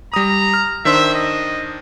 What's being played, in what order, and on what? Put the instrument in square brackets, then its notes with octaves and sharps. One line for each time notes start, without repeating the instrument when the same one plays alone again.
[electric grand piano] G3 D#6 [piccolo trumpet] A#5
[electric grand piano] F6
[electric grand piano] D#3 D4 C5 [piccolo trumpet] E5
[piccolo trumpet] D#5